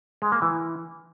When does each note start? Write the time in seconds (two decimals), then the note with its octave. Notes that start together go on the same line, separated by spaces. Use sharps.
0.22 G#3
0.32 A#3
0.42 E3